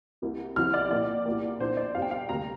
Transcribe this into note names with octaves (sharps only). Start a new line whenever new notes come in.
C2 C3 A#3
C2 C3 F3 C4 F6
D5
A#1 A#2 A#3 D5
C2 A#2 A#3
A#1 A#2 A#3 D4 C5
D5
G2 G3 C4 F5
G5
F5
D2 C3 G3 A#3 A#5